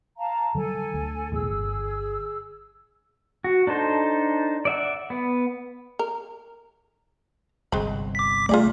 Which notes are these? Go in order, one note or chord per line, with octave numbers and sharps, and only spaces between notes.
F5 A5 A#5
D3 F#3 G3 A4 G#5
D2
B1 E2 A2 G#4 E6
G1
F#4
D4 D#4 A4 C5
D5 E5 F#5
B3
A#4
G1 C2 G#3 C4 B5
D6 B6
C2 A3 F4 G#4 D5